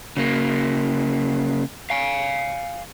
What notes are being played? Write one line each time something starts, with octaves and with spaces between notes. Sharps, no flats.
C#3 A#3
F5 G#5